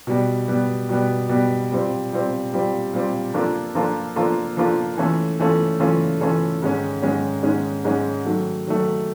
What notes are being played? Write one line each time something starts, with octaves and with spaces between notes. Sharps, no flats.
B2 G3 B3
B2 G3 B3
B2 G3 B3
B2 G3 B3
A#2 G3 C4
A#2 G3 C4
A#2 G3 C4
A#2 G3 C4
F3 A#3 D4 F4 A4
F3 A#3 D4 F4 A4
F3 A#3 D4 F4 A4
F3 A#3 D4 F4 A4
E3 A3 C#4 F4 A4
E3 A3 C#4 F4 A4
E3 A3 C#4 F4 A4
E3 A3 C#4 F4 A4
G#2 D#3 G#3 C#4
G#2 D#3 G#3 C#4
G#2 D#3 G#3 C#4
G#2 D#3 G#3 C#4
D#3 F#3 A3
D#3 F#3 A3